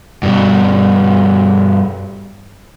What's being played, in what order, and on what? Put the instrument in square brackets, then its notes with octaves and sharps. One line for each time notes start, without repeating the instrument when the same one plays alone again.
[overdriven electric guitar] G2 B2